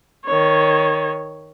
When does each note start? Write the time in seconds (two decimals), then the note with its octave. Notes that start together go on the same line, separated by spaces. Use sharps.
0.25 D#3 C#5